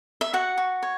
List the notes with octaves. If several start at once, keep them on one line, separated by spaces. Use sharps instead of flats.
E5
F#4 F#5
F#4
C#5